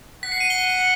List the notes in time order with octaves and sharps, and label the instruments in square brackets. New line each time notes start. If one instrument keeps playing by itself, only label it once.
[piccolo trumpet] F#5 [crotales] B6
[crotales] C7
D#7
G7